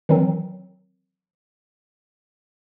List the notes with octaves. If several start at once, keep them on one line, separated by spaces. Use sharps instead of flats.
D#3 E3 F#3 C4